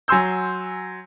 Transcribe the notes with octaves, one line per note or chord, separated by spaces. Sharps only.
F#3 G#5 C6 E6 G6